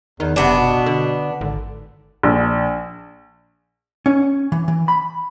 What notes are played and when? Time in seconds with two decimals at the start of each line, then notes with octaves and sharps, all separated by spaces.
0.20 E2 D#3
0.36 F#1 C3 B3 D4
0.57 B2
0.86 D3
1.41 G#1 D3
2.23 A#1
4.06 C#4
4.52 E3
4.68 E3
4.88 B5